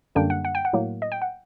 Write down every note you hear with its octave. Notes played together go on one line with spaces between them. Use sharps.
F#2 D3 G3 A#3 D4 G5
F#5
F#5
G5
F#5
A2 F#3 A#3
D#5
G5
F#5